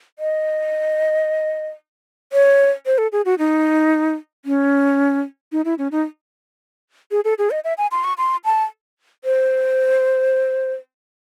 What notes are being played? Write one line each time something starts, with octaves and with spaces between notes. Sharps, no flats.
D#5
C#5
C5
A4
G#4
F#4
D#4
C#4
D#4
E4
C#4
D#4
G#4
A4
G#4
D#5
E5
G#5
C6
C#6
C6
A5
C5